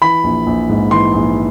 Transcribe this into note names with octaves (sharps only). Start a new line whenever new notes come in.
E3 B5
A#1
A#1
G#2
E3 C6
A#1